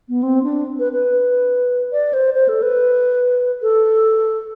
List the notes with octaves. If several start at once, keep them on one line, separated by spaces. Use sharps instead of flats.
B3
C4
D4
B4
B4
D5
C5
C5
A4
B4
A4